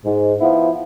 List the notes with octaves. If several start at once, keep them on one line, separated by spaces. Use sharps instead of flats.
G#2
F3 B3 E4